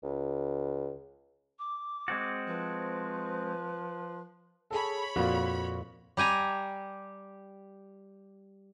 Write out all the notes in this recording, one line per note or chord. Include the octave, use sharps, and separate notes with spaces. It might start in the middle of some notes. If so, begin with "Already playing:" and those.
C#2
D6
G#3 C4 F#4
F3 B4
G#4 A4 C#5 B5
F2 A#2 F4 F#4
G3 G4 G#5 A#5